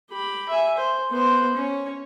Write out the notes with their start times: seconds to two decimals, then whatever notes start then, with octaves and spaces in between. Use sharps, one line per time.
0.11 G4 B5
0.49 E5 G#5
0.78 C5
1.11 B3 C5
1.56 C#4 C#5